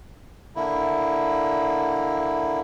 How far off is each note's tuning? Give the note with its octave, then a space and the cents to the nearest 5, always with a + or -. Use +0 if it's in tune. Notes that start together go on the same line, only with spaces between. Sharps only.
D3 +0 A#3 -5 E4 +0